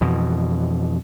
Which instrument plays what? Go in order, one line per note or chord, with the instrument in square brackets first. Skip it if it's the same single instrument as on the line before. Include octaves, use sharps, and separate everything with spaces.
[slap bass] F2 B2 E3